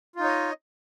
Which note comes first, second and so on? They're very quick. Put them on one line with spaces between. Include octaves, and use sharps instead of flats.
F4 D#4 C#5 D#5